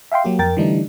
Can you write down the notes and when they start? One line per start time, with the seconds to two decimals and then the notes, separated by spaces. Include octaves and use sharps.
0.12 E5 F5 G5 C6
0.25 F#3 A#3 G4
0.39 F2 A#4 G5 A6
0.57 D3 E3 G3 A3 D4 D#4